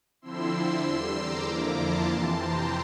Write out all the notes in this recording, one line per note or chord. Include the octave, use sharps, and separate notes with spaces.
D3 F3 C4 E4 C6 E6
E2 D3 G3
A#5 D6
F2 D3 F3 A#3 E4
A5 C6
F2 C3 E3
G5 A#5